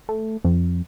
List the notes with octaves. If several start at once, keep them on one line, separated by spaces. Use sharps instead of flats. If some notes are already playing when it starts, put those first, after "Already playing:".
A3
F2